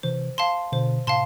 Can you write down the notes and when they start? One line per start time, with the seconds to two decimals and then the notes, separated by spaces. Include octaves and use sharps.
0.03 C3 E3 C5
0.38 F5 A5 C6
0.72 B2 D3 C5
1.07 A2 C3 F5 A5 C6